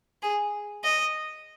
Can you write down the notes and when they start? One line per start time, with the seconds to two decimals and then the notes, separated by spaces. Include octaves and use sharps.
0.22 G#4
0.84 D#5